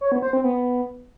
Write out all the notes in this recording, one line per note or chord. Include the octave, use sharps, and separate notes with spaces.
C#5
B3
C5
C4
B3